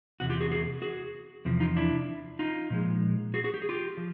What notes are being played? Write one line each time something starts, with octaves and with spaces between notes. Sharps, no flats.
E2 C3 F#4
F4 G4
F#4 G#4
F#4 G#4
F#4 G#4
E2 C3 F3
D#4 F4
D4 E4
D#4 F4
A#2 F3 G#3
F#4 G#4
F#4 G#4
G4
G#4
F4 G4
F3